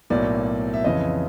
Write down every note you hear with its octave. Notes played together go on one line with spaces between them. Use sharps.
B1 A2 F#3 A#3 D5
E5
F2 C#3 E3 D#5